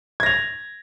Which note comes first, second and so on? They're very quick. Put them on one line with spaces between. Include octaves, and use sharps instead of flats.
G#6 A#6 F7